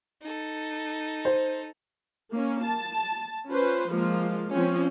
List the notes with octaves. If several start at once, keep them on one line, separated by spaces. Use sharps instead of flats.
D#4 A4
C5
A#3 C#4
A5
C#4 F4 B4 C5
F3 G#3 A#3 F4
F3 C4 C#4